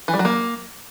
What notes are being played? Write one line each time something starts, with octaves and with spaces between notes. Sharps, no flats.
E3
G3
F#3
A#3